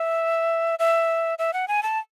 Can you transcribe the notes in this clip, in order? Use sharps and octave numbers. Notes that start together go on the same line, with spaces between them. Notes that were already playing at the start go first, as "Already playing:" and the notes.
Already playing: E5
E5
E5
F#5
G#5
A5